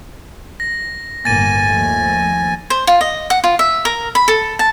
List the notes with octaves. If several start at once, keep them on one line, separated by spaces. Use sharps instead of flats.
A#6
G1 A2 A#3 G#5 A6 D#7
D#2 F3 A3
C5
F4
D#5
F#5
F4
E5
A#4
B5
A4
A5